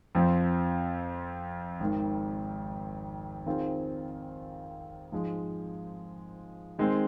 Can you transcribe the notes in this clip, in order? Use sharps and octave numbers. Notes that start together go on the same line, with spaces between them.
F2 F3 C4
G#1 G#2 D#3
D#3 C4 F4 G#4 C5
G#2 F3 G#3
D#3 G#3 C4 G#4